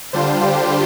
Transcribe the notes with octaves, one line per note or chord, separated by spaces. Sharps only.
D3 G3 D4 F4 C5
G4